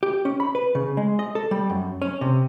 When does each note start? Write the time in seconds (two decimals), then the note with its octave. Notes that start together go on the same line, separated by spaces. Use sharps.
0.03 G4
0.25 C#4
0.40 B5
0.55 B4
0.75 C#3
0.97 G#3
1.19 D#5
1.35 A4
1.51 G3
1.70 F#2
2.02 C#4
2.21 C3